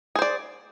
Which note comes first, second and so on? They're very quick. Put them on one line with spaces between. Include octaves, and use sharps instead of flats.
G#4 C5 D5